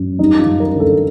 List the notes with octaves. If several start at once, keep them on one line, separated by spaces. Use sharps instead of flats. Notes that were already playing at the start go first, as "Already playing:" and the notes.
Already playing: F#2
G3 D#4
F4
F#2
A#4
D3
A4